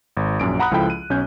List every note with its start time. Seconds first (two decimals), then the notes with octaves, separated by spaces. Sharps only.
0.17 G#1
0.40 A#1 F#2 D7
0.59 F#5 A#5 B5 D#6 F#6
0.71 C#2 F3 E4 A4 G5 B5
0.90 D#7
1.10 B1 C#4 G6